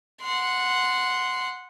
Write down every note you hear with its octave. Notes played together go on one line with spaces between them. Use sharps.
F#5 C6